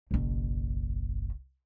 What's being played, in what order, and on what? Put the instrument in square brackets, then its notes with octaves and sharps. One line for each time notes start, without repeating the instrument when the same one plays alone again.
[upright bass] F#1 B1